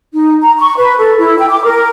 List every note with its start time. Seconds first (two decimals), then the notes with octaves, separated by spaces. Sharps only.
0.13 D#4
0.42 A#5
0.58 C#6
0.77 B4
0.98 A4
1.18 E4
1.38 G5
1.49 D6
1.64 A#4